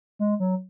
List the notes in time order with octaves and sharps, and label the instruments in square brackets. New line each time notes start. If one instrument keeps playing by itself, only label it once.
[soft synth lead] G#3
F#3